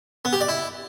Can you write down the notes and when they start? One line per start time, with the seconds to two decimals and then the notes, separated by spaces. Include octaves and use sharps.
0.25 B3
0.33 G4
0.41 D5
0.48 E4